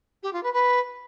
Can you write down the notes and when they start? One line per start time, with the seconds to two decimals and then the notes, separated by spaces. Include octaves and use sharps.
0.23 G4
0.33 F4
0.43 B4
0.53 B4